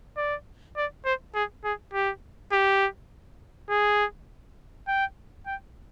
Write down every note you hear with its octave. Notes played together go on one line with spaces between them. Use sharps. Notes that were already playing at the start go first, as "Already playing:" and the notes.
D5
D5
C5
G#4
G#4
G4
G4
G#4
G5
G5